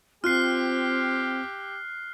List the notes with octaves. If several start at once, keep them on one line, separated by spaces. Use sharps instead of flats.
C4 F4 G4 F6 F#6 C7